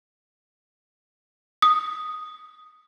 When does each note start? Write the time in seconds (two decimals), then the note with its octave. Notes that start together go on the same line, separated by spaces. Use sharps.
1.62 D#6